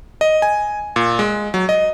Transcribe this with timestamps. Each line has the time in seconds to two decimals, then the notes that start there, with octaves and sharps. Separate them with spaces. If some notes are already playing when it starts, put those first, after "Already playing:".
0.21 D#5
0.42 G#5
0.96 A#2
1.19 G#3
1.54 F#3
1.69 D#5